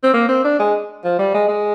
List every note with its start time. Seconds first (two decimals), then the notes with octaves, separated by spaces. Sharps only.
0.03 C4
0.14 A#3
0.28 C4
0.44 D4
0.59 G#3
1.04 F3
1.19 G3
1.34 G#3
1.48 G#3